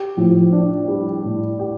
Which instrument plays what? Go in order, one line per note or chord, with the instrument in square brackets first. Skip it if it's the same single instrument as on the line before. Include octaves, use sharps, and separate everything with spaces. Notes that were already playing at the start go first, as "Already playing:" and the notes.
Already playing: [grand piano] G4
[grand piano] A2 [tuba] F3
[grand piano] D4
G3
A2
G4